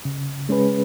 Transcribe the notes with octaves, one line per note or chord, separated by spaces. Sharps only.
C#3
G#3 C#4 G#4 B4